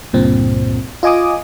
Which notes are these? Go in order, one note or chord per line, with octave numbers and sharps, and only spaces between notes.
C#2 G2 A#2 C4
F4 D#5 G#5 D6 D#6